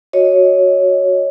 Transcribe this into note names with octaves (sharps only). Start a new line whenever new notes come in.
F#4 C#5 D#5